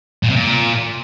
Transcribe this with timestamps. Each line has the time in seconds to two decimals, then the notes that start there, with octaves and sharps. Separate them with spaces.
0.23 A#2
0.29 C3
0.36 A#2